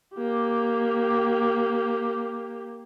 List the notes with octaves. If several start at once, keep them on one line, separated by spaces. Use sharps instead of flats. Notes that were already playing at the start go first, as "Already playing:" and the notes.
A#3 G4